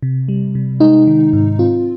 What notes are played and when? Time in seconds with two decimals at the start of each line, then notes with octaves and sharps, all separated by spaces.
0.03 C3
0.28 G3
0.55 C3
0.80 G#3 D#4
1.07 D#3
1.33 G#2
1.59 C4 F4